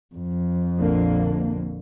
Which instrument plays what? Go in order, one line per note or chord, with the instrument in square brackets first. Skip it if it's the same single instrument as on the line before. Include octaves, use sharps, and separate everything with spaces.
[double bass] F2
[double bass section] A#1 D3 A#3